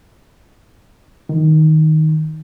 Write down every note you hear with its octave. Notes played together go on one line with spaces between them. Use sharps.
D#3